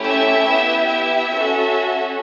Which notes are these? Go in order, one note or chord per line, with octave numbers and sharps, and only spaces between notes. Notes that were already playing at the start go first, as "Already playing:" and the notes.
Already playing: A3 C#4 E4 G4
E5
B3 E4 G4
E5
C#4 F#4 A4